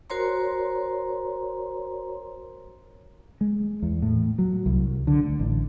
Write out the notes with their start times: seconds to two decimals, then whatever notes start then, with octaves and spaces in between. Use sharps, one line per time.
0.10 F#4 A#4 C5 C#5 A#5 C6
3.41 G#3
3.83 E2
4.02 A2
4.38 F#3
4.66 C2
5.07 D3
5.24 D2
5.39 A1